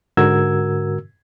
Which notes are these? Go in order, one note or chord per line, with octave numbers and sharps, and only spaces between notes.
G#2 D3 F#4 A#4 E6 G#6